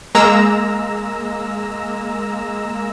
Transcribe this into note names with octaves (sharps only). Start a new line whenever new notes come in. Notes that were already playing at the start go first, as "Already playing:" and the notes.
G#3 A#3 A#5 E6